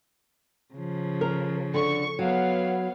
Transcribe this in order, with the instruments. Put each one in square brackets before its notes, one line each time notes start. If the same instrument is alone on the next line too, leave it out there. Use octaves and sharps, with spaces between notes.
[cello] C#3 F3
[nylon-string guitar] A#4
[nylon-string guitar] D3 [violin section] C#6
[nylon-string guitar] F#3 [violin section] B3 C#5 F5